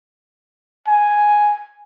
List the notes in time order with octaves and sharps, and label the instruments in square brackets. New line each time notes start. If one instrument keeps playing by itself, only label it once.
[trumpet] G#5